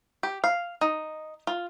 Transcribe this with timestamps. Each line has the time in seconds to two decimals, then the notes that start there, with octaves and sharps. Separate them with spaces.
0.23 G4
0.44 F5
0.81 D#4
1.47 F4